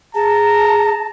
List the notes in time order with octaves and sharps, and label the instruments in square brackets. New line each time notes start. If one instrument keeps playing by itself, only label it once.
[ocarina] G#4 [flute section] A5 [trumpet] A#5